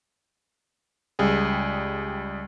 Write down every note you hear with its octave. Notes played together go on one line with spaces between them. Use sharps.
C#2 G3 G#4